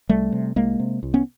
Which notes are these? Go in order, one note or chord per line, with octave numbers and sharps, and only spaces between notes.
C2 G3 A3
C3
C2 G#3 A#3
C3
C2
B3 C#4